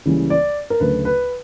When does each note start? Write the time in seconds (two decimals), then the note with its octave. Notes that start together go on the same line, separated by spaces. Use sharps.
0.06 C#2 C#3 E3 G3 A#3
0.30 D5
0.70 A#4
0.80 D2 C#3 F#3 A3 B4
1.05 B4